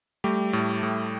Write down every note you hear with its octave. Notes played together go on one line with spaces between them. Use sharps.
G3 A3 G4
A2
A2